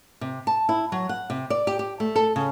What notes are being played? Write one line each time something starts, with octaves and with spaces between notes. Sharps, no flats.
C3
A5
E4
F#3
F#5
C3
D5
G4
G4
A3
A4
C#3